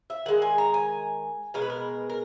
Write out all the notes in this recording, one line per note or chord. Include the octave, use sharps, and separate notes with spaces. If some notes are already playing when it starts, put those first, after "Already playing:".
E5
D#3 G#3 F#5
G#5
A#5
G#5
B2 G#3 A#4
B4
A#4
A#4